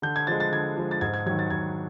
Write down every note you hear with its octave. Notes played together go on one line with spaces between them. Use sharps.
D3 G6
G#6
F3 G#3 A6
A6
D3 G#6
F3 G#3
A6
G#2 G#6
G#6
D#3 F#3 G#6
A6
G#2 G#6